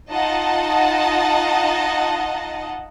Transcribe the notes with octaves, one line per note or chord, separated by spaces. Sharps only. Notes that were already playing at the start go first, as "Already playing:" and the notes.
D#4 F4 D#5 F#5 A5